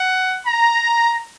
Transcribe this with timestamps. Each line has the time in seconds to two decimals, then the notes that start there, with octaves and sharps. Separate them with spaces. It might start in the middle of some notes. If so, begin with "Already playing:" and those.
Already playing: F#5
0.47 A#5